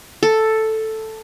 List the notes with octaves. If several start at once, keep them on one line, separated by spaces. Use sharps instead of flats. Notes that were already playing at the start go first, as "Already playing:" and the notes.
A4